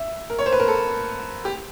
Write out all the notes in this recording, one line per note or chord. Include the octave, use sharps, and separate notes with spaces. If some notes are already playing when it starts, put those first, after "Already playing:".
Already playing: E5
A#4
C#5
C5
B4
A#4
A4
G4